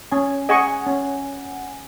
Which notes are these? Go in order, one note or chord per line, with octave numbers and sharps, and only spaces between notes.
C#4 G#5
G#4 D#5 F#5 G#5 C#6
G#5
C#4